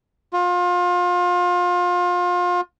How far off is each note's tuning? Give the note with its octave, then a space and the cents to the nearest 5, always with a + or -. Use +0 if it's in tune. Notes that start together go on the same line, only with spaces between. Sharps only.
F4 +30